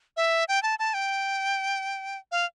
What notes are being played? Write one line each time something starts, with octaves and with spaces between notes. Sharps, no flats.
E5
G5
A5
A5
G5
F5